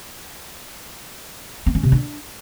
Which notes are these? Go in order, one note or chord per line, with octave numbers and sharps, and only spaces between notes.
C4
C#4
C3
D4